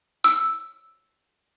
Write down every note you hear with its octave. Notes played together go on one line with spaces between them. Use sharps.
E6